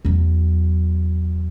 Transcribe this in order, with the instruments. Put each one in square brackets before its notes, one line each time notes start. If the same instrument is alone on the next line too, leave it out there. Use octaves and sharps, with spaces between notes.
[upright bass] E2 F#3